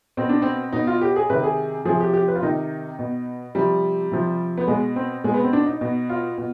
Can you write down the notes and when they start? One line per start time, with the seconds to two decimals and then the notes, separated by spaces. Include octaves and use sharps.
0.17 B2 C4
0.29 D4
0.42 C4
0.72 B2 D#4
0.87 F4
1.01 G4
1.16 G#4
1.30 C3 D#3 B4
1.43 G#4
1.85 C3 F3 G#4
2.01 G4
2.14 G4
2.28 B4
2.36 F4
2.42 C3 D#3 D#4
2.99 B2
3.55 C3 F3 G3
4.12 C3 F3
4.58 B3
4.67 B2 G#3
4.96 C4
5.24 B2 G#3
5.34 B3
5.43 C4
5.53 D4
5.66 D#4
5.81 B2
6.10 F4
6.38 B2